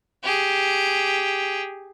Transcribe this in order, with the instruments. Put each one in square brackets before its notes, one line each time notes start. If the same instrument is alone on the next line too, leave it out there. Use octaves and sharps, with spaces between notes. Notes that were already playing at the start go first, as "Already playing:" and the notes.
[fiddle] G4 G#4